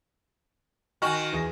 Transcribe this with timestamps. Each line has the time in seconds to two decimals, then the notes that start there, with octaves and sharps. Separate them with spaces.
1.02 D#3 F#4 G#5 C#6 F6
1.33 E2 G#4 A#6